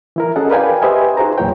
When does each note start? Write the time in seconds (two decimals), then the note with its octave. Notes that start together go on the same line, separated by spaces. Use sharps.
0.16 E3 E4 A#4
0.36 C#4 F#4 G#4 A4 D#5 F#5
0.50 A#4 B4 D5 F5 G5 G#5
0.82 G4 B4 C5 D#5 E5 G#5
1.17 D#4 F#4 G#4 C5 A#5
1.38 E2 A#2 F#3 E4 C#5 G5